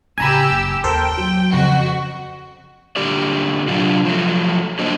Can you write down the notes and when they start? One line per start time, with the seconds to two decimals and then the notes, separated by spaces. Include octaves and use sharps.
0.18 A1 C#3 G4 G#5 A#5 B5 E6
0.50 F#1 F#3
0.84 D#2 A4 A#4 C5 G5
1.18 F#3
1.52 F2 C#3 C4 F#4
2.96 A#2 D3 G4 D5
3.68 C3 F#3 D4 F4
4.05 F3 F#3 A3
4.79 F#3 A#3 B3 D4 C5 D#5